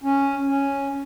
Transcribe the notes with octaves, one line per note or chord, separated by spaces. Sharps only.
C#4
C#4